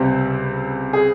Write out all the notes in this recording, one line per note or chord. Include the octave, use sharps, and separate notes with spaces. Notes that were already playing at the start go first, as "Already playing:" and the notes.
Already playing: C#2 C3 G3 C4
G#4